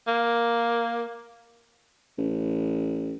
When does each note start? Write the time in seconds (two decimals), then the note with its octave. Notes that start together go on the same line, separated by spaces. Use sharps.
0.07 A#3
2.18 A1